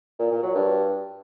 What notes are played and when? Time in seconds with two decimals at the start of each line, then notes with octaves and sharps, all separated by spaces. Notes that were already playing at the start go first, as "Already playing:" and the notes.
0.19 A#2
0.31 A#2
0.43 F#3
0.55 G2